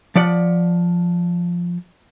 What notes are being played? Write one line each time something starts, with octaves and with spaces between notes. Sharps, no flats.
F3 D5 F#5